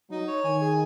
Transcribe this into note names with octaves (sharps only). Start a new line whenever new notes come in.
F#3 D#4
C#5
D#3 G#5
G#4